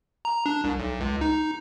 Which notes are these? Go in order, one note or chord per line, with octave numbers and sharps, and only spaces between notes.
A#5
D4
C2
B1
C#2
D#4